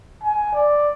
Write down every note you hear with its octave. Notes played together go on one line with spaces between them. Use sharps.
G#5
D5